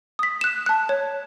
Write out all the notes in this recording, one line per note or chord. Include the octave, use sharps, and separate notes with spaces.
D#6 B6
F#6 E7
A5 F#6
C#5